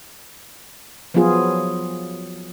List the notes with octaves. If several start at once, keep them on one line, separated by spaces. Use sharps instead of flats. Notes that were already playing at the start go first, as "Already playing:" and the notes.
F3 F#3 B3 F4 G#4